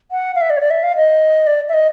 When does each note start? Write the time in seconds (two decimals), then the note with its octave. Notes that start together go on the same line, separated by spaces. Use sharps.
0.11 F#5
0.35 F5
0.41 E5
0.50 D5
0.57 C#5
0.60 D5
0.70 E5
0.83 F5
0.96 D#5
1.47 D5
1.69 E5
1.73 D#5